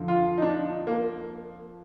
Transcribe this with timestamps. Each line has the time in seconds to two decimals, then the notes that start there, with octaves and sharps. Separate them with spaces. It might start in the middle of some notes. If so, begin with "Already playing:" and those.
Already playing: F2 D3 F3
0.08 F4
0.38 D#4
0.42 D4
0.87 A#3